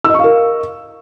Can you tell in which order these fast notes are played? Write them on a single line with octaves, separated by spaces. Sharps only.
E6 D#5 C#6 F5 A#4